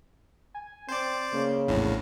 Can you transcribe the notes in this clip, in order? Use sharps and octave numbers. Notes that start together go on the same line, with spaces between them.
G#5
C4 C5 D5 A6
C#3 A#3
A#1 E2 A2